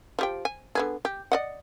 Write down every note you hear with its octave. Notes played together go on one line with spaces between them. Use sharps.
F3 G4 G5
G#5
D3 B3 G#4
G4
D5 D#5 F#5